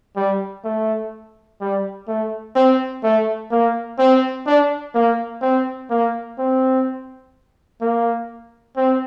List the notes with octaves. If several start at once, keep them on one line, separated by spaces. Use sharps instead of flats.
G3
A3
G3
A3
C4
A3
A#3
C4
D4
A#3
C4
A#3
C4
A#3
C4